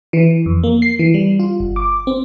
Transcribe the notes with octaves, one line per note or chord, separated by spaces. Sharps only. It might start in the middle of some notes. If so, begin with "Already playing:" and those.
E3
F2
A#3
C7
E3
G3
F4
G1
D6
C4